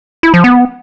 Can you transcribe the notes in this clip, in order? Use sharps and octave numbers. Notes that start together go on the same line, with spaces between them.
E4
F3
B3